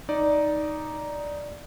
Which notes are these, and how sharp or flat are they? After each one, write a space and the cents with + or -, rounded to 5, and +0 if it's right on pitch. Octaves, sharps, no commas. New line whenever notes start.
D#4 +0 D5 -5